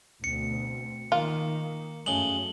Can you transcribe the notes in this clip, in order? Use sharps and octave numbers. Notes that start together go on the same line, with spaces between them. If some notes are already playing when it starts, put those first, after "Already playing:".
D2 B2 C4 C#7
D#3 A#3 F4
F#2 C#3 G#3 A3 F#7 G7